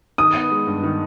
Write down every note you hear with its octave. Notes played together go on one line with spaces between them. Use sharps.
D#3 D#6
B3
G#3
G2
D#3